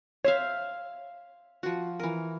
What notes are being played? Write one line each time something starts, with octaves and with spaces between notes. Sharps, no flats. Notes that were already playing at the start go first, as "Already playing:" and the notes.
C5 C#5 E5 F5
F3 F#4
E3 A#4